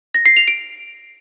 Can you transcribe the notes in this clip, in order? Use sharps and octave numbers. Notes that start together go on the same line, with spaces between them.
A#6
C7
F7
D7